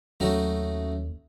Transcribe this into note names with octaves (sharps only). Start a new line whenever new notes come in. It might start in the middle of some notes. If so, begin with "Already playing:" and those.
D#2 F#3 A3 C#4 D#4 F#4